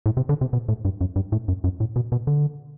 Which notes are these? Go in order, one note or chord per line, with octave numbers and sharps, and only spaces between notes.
A2
C3
D3
C3
B2
A2
G2
F#2
G2
A2
F#2
F#2
A2
B2
B2
D3